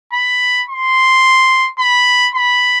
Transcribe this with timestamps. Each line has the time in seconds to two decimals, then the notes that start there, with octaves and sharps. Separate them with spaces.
0.13 B5
0.69 C6
1.79 B5
2.35 B5